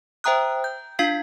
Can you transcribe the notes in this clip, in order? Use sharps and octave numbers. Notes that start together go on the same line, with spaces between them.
C5 E5 G5 A#5 D#6 F#6
G6
D4 F4 F5 G#6 B6 C7